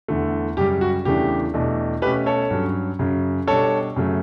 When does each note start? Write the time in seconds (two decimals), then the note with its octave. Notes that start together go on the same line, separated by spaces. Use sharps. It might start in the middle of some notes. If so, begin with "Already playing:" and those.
0.08 E2 D3 A3
0.57 F#2 C#3 G3 G4
0.81 F#4
1.05 E2 C#3 E3 A3 D4 G4
1.54 E2 B2 A3 D4
2.02 B2 A3 C#4 G4 B4
2.26 A4 C#5
2.51 G2 F#3 C#4
2.99 F#2 C#3 F#3 C#4
3.47 B2 G3 D4 A4 C#5
3.96 F#2 C#3 F#3 A3